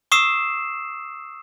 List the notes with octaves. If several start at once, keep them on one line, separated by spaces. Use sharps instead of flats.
C#6 D#6 E6 C7 E7